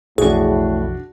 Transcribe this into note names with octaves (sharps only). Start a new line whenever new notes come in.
B1 F2 A2 E3 D4 F#4 G#4